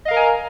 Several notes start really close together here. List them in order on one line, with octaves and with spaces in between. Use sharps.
D#5 F5 A#4 A#5 G#5